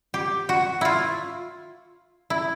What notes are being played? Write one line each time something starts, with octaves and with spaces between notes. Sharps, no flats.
G4
F#4
E4 F4
E4